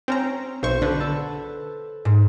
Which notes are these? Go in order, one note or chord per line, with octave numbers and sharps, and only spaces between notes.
C4 C#4 A#5
B1 C5 C#6
D3 B4
A4
G#2